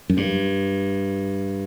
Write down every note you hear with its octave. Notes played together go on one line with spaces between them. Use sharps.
F#2
G2